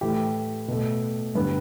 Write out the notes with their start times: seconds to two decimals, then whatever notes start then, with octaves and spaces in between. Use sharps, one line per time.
0.01 A2 E3 A3 G4
0.68 B2 A3
1.35 G2 D3 G3 B3